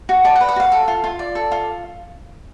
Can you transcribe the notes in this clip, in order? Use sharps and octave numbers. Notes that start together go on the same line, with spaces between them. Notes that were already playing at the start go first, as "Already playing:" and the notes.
F#4
D5 A5
F#5
B4
F#5
F#4 F5
A4
F4
F4
D5
A4
F4